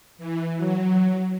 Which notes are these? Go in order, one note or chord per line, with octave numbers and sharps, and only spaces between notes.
E3
F#3